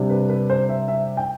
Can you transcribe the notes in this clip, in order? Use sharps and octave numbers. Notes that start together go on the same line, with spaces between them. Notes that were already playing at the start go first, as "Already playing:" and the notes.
Already playing: C3 G3 D4
B4
B4
C5
E5
E5
G5